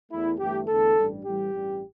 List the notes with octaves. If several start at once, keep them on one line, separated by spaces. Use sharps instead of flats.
E2 E3 A3 E4
G1 G2 E3 A3 G4
E2 D3 A3 A4
A1 G2 G3
A1 A2 E3 G3 G4
A1 G2 G3